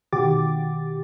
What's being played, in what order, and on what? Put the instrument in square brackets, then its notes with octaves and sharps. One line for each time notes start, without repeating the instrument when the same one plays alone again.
[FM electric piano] B2 D#3 F#4 G4 D6 A6